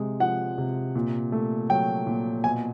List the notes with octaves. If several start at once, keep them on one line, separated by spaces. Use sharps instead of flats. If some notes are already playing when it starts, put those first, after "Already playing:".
Already playing: C3 G#3
F3 F#5
C3
A#2
A3
F#3 G5
A#2
B2 G#5